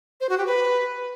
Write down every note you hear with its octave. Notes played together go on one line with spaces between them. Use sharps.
C5
F#4
G4
B4